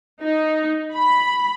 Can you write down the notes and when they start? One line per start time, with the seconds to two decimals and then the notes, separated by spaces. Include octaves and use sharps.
0.22 D#4
0.94 B5